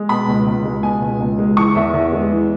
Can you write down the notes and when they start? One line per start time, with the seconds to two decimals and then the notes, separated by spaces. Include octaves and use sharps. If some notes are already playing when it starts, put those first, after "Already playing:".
Already playing: G#3
0.09 B2 B5
0.28 C#2
0.46 C#2
0.64 G#3
0.83 B2 G#5
1.01 C#2
1.20 C#2
1.39 G#3
1.57 E3 C#6
1.75 E2 E5
1.94 E2
2.12 G#3
2.31 E3